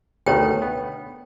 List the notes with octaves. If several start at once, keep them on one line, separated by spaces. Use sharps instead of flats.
D2 B2 D#3 C#5 G5
B3